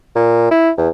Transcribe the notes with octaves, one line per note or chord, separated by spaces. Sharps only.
A#2
E4
E2